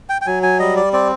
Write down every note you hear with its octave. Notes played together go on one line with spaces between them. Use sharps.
G5
G5
F#3 G#5
G#5
G3 D#5
D5
C4 D5